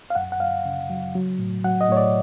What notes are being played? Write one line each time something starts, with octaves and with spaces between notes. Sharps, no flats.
F5
F#2 F#5
F#5
F#2 F5
C#3
F#3
F#3
A2
F#3 F#5
D#5
A2 C#5
D5